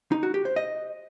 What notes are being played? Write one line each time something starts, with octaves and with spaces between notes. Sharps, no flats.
D#4
F#4
G4
C5
D#5